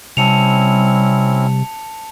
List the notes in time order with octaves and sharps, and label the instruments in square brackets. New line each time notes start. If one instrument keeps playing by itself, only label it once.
[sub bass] C3 [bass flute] G3 [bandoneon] C4 C#4 E4 [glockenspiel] A5 C#7 F7